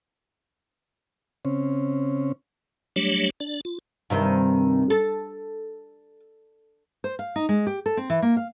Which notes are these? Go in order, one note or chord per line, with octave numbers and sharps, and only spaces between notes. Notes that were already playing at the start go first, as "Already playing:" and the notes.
C#3 C4 C#4
F#3 G3 A3 D4 G4 C#5
D4 D5
F4
G2 C3 D#3
A4
C5
F5
D#4
G#3
G4
A4
C4
E3
A#3
F5